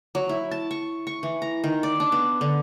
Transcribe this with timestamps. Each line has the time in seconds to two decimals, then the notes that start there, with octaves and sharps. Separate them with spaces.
0.15 F#3
0.29 E4
0.51 A5
0.71 C#6
1.07 C#6
1.23 E3
1.42 A#5
1.64 D#3
1.83 D5
2.00 D4
2.12 B3
2.41 D3